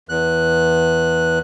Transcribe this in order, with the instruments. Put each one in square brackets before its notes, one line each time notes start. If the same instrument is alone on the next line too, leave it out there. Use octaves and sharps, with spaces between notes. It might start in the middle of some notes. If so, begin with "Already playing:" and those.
[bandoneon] E2 F#6